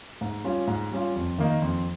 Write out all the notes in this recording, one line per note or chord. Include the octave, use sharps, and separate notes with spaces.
G#2
G3 C#4 F4
G#2
G3 C#4 F4
F2
D#3 A#3 D#4
F2